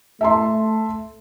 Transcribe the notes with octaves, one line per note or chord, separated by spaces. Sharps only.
A3 E5 A5 C6